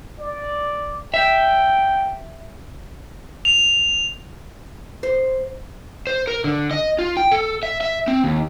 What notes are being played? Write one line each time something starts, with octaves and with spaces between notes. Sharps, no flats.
D5
E5 G5
F7
C5
C5
A#4
D3
D#5
F4
G5
A4
E5
E5
C4
D#2